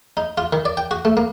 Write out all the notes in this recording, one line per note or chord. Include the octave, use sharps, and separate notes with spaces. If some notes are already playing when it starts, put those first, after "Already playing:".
D#4
F4
D#3
D5
G5
F#4
A3
A#3